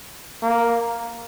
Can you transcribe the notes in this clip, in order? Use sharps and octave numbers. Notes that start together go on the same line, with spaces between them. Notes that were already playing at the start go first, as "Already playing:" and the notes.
A#3